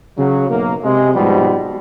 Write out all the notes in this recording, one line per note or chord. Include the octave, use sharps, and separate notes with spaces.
C#3 F#3
B1 F#2 A#3
C3 G#3
G#2 B2 F3 G3